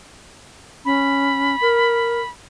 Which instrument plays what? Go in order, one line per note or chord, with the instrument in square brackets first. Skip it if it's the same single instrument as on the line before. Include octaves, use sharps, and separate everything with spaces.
[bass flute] C#4 [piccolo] B5
[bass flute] A#4